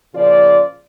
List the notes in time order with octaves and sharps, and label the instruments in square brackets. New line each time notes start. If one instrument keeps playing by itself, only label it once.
[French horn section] A#2 C#3 F3 F4 D5